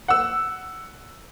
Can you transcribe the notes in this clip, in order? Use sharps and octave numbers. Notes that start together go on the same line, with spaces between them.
F#5 E6